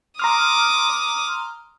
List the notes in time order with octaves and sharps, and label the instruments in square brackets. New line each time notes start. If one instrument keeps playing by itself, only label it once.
[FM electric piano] A#5 C6 F6 [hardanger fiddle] D6 D#6